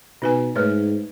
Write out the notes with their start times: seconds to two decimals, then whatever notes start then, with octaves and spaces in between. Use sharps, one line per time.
0.22 B2 D#4 B4 G#5
0.56 G#2 A3 B4 C#5